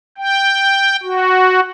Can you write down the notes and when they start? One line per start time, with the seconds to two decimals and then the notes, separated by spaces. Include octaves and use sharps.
0.18 G5
1.03 F#4